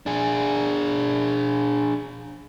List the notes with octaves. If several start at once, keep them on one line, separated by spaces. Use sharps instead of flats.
D4 G#4